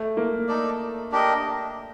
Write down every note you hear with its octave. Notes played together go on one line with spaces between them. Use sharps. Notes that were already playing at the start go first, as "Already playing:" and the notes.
Already playing: A3
A#3
D#4 A4 D5
D4 G4 A#4 D#5